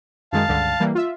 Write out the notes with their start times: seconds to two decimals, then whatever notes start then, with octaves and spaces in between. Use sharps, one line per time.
0.33 F#2 D#3 G#3 F5 A5
0.48 C#2 G2 D3
0.80 E3 G3 A#3
0.95 F4 E5